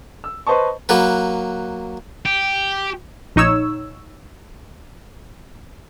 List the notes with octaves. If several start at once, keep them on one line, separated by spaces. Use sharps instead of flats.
E6
B4 C5 D#5 A5 C#6
F#3 A#3 B4
G4
A#1 D#4 C#5 E6